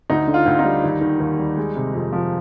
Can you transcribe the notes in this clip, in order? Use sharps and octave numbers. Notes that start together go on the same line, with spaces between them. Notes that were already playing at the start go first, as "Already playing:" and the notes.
D2 D#4
D3
F4
D2
D#4
G3
D#2
D#3
D#2
G3
G#3
C3
F2
F3